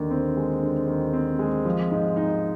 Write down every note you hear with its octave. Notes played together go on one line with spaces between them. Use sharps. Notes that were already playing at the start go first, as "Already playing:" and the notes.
Already playing: D#2 D3
C4
G#3
D3
D#2
C4
G#3
F3
G#2
D#4